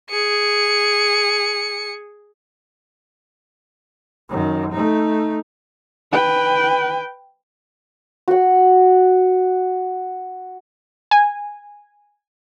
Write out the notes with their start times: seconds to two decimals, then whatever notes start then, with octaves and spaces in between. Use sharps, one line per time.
0.10 G#4 C#7
4.29 F#2 D#3
4.72 A3 D#4
6.12 B4 G5
8.28 F#4 F#5
11.11 G#5